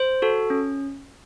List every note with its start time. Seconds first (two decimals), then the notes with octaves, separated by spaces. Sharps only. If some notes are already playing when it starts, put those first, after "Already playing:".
Already playing: C5
0.22 F#4 A4
0.50 C#4